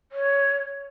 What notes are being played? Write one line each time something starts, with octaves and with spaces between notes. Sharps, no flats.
C#5